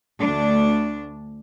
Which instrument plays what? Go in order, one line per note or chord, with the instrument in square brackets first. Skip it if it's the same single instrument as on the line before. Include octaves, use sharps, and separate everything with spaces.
[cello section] D2 D4